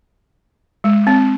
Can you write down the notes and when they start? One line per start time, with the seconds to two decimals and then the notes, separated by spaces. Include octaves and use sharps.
0.84 G#3
1.07 C4